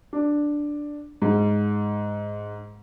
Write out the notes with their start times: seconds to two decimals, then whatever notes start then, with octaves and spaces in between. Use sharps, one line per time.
0.13 D4
1.22 G#2